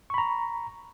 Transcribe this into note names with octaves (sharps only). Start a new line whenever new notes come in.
A#5 B5 C#6